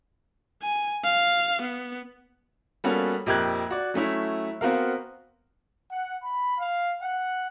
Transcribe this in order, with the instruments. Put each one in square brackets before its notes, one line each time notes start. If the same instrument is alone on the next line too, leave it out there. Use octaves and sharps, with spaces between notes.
[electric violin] G#5
F5
B3
[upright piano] G3 A#3 B3 C#4 F#4 A4
A#1 F2 G4 A#4 F#6 G#6
F#4 D5
F#3 A3 C#4 E4
B3 C4 F#4 A#4 F5
[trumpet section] F#5
B5
F5
F#5